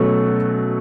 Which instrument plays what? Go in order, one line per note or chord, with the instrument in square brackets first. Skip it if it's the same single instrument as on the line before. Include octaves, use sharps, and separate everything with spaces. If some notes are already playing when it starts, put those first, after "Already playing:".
Already playing: [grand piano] B2 F#3 A3 C#4